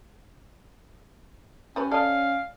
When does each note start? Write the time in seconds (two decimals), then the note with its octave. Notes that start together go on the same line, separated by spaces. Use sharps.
1.76 G3 C#4 B4 C#5
1.91 A4 D5 D#5 F5